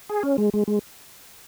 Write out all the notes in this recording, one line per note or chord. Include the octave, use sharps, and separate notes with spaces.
G#4
C#4
G#3
G#3
G#3